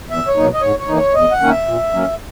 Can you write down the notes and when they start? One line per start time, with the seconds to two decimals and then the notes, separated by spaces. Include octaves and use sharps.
0.10 E2 E5
0.28 C#5
0.36 B2 F#3 A#3 D#4
0.54 D#5
0.62 G#2 C#5
0.79 C#5
0.88 E3 A#3 D#4
0.96 C#5
1.14 E2 D#5
1.31 F#5
1.40 D#3 A#3 C#4
1.50 E5
1.67 A#2
1.93 F#3 A#3 C#4